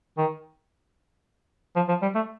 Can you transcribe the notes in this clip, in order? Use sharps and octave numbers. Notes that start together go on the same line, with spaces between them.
D#3
F3
F3
G3
A3